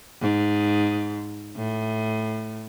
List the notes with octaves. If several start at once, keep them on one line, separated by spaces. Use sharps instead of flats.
G#2
A2